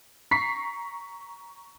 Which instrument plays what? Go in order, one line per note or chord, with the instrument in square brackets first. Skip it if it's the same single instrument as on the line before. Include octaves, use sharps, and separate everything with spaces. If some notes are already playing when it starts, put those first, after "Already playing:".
[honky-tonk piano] A#5 C#6 B6 C7